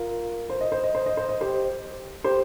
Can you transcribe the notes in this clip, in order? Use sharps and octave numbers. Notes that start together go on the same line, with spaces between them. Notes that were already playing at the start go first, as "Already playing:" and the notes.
Already playing: F4 A#4
C5
D#5
C5
D#5
C5
D#5
C5
D#5
G4 C5
G4 C5